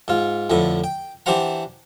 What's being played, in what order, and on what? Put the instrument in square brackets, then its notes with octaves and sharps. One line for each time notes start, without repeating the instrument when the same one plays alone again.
[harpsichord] G#2 F4
F2 A2 D3 B4
G5
E3 D4 G4 C5 F#5 A#5